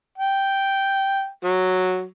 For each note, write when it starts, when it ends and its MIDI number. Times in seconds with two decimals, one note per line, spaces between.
0.18 1.27 79
1.44 2.05 54